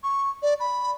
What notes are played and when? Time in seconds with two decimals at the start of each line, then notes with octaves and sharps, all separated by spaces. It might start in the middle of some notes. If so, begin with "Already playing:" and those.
0.04 C#6
0.42 D5
0.60 B5